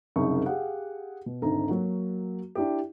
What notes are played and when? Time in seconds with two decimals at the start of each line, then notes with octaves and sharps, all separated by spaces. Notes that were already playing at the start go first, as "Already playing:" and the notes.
0.16 C2 F#2 C#3 D#4 C#6
0.46 G4 G#4 F5 F#5
1.26 B2
1.42 G#1 D2 D#4 A4 A#5
1.69 F#3 A#3 F#4
2.55 D4 E4 G4